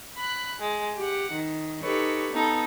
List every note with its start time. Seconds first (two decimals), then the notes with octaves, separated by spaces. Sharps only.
0.16 B5 F#6
0.59 G#3
0.96 G4 F#5
1.32 D#3
1.82 D#4 G4 A4 B4 C#5
2.32 B3 D#4 A4